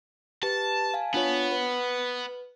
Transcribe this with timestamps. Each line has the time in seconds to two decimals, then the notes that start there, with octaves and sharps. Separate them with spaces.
0.43 G4 B4 A5
0.94 F5 G#5 A5
1.14 B3 D4 F4 C#5
1.52 B4